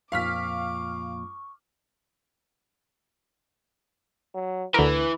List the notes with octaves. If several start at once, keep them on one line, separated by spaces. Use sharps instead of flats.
F2 A#2 F5 C#6 D6 F6 B6
F#3
D2 E3 A#4 B4